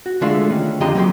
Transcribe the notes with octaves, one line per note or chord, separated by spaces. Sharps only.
F#4
D3 G#3 A3 D4 F4 A4
D#3 C#4
F2 D3 F4 G4 D#5 A#5
F#3 A#3 G4 C6